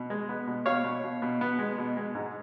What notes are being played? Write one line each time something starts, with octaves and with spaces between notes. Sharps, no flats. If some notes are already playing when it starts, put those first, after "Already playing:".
Already playing: B2
G#3
B3
B2
B2 C#5 F5
B2
B2
B2
B3
G#3
B2
G#3
G#2